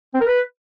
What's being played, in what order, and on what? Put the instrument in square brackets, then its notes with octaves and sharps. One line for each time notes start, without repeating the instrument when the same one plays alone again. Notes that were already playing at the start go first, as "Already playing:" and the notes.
[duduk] C4
A#4
B4